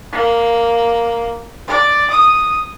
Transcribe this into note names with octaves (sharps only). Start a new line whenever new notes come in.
A#3
D5
D#6